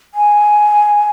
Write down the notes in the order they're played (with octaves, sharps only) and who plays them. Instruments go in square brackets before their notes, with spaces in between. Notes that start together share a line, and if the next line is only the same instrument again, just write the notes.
[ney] G#5